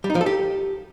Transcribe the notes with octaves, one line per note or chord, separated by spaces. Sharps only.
G3
D#4
F3
A4
G4